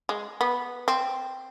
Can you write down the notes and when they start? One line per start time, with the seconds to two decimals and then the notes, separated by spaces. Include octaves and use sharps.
0.09 G#3
0.41 B3
0.88 C4